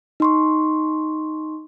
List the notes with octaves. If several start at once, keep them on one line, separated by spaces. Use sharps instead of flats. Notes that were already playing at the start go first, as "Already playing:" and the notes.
D#4 C6 C#6